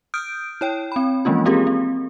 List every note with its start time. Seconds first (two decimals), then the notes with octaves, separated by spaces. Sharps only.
0.14 D#6 F6 G6 D7
0.61 E4 C#5 G5
0.92 C4 B5
1.25 E3 F3 G#3 A#3 C#4 F4
1.45 A#3 C4 F4 G4 G#4 A#4
1.67 C4